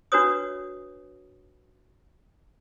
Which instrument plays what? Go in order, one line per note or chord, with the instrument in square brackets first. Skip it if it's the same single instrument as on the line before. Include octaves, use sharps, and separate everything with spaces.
[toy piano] D4 F#4 B4 C#5 D#6